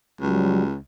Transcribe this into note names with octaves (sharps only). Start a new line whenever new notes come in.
C#2 F#3 G3